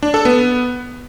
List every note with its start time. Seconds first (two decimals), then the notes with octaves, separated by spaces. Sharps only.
0.03 D4
0.14 A4
0.25 B3